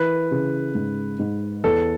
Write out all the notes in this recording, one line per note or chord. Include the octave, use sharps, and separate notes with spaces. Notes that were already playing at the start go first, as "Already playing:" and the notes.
Already playing: E3 B4
C#3
G#2
G#2
E2 A4